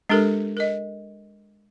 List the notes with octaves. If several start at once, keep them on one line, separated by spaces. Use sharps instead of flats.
G#3 D4 G4 A4 A#4
A#4 D#5